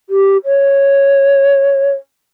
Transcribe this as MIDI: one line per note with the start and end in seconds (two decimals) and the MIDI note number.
0.10 0.37 67
0.46 1.91 73